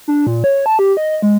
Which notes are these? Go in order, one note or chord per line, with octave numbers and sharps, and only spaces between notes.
D4
A#2
C#5
A5
G4
D#5
G#3